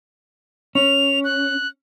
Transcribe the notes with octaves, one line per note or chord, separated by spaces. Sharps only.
C#4 F7
F#6